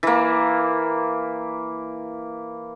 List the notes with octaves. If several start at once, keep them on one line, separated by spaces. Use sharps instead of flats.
E3 A#3